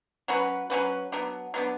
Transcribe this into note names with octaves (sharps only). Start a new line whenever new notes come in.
F#3 C#4 F#4 B4
F#3 C#4 F#4 B4
F#3 B3 D4
F#3 B3 D4